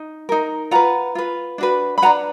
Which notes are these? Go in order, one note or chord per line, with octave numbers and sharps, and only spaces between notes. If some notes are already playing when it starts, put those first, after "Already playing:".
Already playing: D#4
D#4 A#4
F4 B4 F#5 A#5
F4 B4
D4 F#4 B4
B5
D4 F#4 B4 F#5 A#5